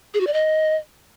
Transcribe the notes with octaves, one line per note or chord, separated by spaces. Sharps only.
G#4
F#4
D5
D#5